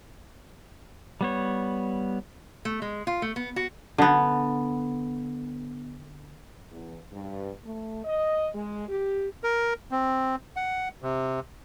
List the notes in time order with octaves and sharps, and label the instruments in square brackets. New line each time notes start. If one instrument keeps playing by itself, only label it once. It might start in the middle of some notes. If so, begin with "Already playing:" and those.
[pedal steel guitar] G3 B3 C#5
[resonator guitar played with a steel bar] A3
G#3
F4
A3
B3
F#4
[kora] D3 B3
[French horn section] E2
G2
A3
D#5
G#3
G4
[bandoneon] A#4
C4
F#5
C3